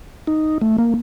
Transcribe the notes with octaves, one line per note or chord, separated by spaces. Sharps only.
D#4
A3
A#3